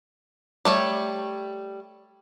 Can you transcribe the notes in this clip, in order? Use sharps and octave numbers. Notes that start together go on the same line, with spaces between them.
G3 A3 C#5